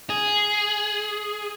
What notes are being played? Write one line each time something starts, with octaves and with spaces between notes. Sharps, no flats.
G#4